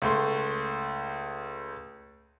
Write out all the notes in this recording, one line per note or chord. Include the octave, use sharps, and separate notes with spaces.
C#2 A3 C6